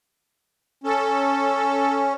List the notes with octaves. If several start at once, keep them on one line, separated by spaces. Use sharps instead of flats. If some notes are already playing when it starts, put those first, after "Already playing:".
C#4 A4